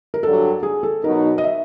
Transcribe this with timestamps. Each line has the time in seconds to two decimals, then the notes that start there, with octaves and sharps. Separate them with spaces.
0.14 A#4
0.23 G2 D3 F#3 A4
0.63 G#4
0.83 A4
1.03 B2 F#3 B3 D#4 A#4
1.38 D#5
1.44 E5